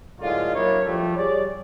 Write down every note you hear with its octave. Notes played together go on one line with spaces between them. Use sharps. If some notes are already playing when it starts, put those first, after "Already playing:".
A2 D3 F#3 G#3 A#3 F4
F#3 A#3 D4 E4 A#4 C#5
F3 G3 A3
G3 G#4 C#5 D5